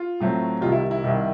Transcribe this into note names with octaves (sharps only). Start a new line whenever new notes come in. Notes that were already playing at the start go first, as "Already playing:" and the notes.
Already playing: F4
A2 F#3 A3 C4
C2 C3 D#3 G3 F4
E4
E4
C2 C3 D#3 G3